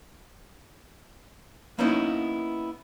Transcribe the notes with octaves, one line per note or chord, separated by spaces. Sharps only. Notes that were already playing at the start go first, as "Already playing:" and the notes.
A#3 B3 C#4 D#4 E4